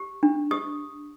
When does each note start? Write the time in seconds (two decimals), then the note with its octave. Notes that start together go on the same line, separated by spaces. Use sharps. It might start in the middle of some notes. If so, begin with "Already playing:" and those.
Already playing: G4
0.23 D4
0.51 G4 D#6